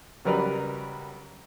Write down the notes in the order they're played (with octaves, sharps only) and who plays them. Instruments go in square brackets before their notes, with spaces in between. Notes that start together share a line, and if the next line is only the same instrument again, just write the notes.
[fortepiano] C#2 F#3 G3 A#4 B4 D5